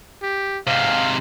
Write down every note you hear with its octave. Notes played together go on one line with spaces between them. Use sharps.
G4
G#2 C3 F5